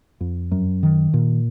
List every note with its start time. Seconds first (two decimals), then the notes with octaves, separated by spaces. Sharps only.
0.21 F2
0.52 F#2
0.83 D#3
1.14 A#2